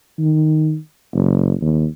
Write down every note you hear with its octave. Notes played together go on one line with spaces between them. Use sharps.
D#3
F#1
D#2